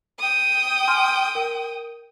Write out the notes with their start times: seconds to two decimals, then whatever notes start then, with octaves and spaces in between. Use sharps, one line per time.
0.19 G5 D#6
0.87 G#5 C6 F6
1.35 A#4